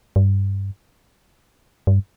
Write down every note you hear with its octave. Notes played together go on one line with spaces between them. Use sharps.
G2
G2